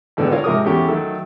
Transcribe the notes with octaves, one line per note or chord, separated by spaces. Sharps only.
G#1 A2 D3 B3 G5
D4 E4 F4 A#4 C#5 F5
G#2 C3 F3 A#4 D6 D#6
E2 A3 C#4 G4 G5 C#6
D#3 F#3 A3 A4